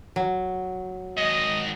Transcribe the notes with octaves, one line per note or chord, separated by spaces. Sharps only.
F#3
G#2 D#3 D#5